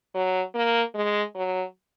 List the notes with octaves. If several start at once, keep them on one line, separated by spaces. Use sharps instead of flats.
F#3
A#3
G#3
F#3